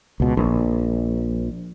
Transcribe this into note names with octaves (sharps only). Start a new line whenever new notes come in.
C#2 B2
A#1